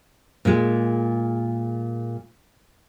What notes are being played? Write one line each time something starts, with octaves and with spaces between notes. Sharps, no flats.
A#2 G#3